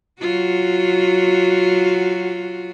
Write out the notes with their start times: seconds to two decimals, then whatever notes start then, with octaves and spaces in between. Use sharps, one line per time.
0.20 F#3 F4 F#4